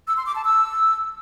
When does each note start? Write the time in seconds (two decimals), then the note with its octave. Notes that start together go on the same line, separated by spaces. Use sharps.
0.08 E6
0.17 C6
0.26 D6
0.35 A5
0.45 E6